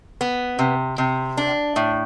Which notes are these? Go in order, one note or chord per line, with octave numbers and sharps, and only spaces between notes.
B3
C3
C3
D4
A2